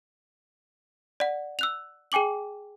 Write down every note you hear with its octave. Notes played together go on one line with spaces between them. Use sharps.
D5 F#5
E6 F#6 F7
G#4 G5 G#5 D6 F#7